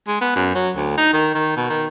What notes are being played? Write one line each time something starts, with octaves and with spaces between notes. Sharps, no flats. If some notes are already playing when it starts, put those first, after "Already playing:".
G#3
B3
F#2
F#3
D2
D#4
D#3
D#3
B2
D#3